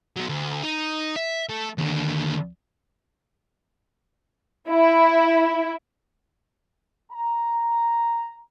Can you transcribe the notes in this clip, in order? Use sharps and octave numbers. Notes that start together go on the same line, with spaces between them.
F#3 B3
D2
D#4
E5
A3
D#2 D3
E4
A#5